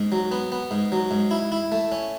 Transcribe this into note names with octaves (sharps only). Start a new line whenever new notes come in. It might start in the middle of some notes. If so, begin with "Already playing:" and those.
Already playing: G#2
F#3
B3
B3
G#2
F#3
G#2
E4
E4
A3
C#4